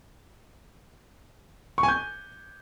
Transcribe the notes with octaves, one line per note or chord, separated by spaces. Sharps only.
C#6
G#5
G6